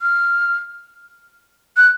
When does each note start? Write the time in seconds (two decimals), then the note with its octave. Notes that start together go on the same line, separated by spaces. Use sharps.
0.02 F6
1.77 F#6